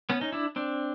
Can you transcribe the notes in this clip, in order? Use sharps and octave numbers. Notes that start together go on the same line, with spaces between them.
B3 C#4
C#4 D#4
D4 E4
C4 D4